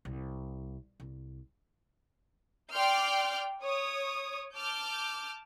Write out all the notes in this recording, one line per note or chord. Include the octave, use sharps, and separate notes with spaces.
C2
C2
D5 G5 C6 D6 F6 G6
C#5 D#6
A5 D6 F6 G6